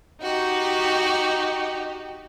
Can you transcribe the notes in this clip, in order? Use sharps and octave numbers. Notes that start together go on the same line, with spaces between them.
D#4 F#4 G4